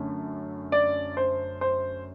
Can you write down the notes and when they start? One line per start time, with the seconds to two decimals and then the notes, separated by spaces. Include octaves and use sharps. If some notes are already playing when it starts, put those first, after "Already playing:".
Already playing: F#2 D3 A3
0.72 D5
1.17 C5
1.61 C5